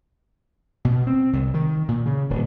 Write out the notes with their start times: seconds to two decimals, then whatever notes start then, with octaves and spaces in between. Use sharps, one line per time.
0.85 B2
1.07 C4
1.33 C2
1.54 D#3
1.88 A#2
2.06 C#3
2.30 D1